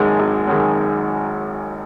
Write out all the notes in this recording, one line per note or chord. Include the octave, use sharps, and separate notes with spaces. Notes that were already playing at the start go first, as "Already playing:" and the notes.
Already playing: G#1 F#2 D#3 G#3
G#1
F#2 D#3 G#3